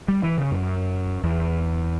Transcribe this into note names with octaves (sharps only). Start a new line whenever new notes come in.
G3
E3
C#3
F#2
E2